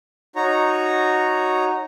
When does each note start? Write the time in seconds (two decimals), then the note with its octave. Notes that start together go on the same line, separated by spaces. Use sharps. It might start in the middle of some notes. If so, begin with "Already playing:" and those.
0.36 D#4 F#4 C#5 A#5